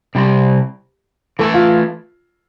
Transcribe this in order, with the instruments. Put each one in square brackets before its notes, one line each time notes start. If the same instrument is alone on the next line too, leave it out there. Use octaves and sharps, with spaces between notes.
[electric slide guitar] C3 G3 C4 [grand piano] G4
[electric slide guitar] E3 A3 E4 [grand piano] A4
[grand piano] F4